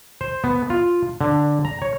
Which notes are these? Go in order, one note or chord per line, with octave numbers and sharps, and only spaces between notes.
C5
B3
F4
D3
A#5
C#5